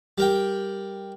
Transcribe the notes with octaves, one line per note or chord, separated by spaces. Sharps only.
G3 A#4 G5